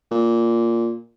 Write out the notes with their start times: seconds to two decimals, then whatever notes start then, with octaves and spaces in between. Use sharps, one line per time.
0.11 A#2